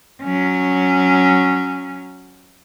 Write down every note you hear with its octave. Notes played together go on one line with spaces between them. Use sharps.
F#3 C#4